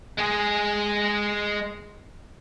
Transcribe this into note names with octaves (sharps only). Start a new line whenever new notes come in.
G#3 G#4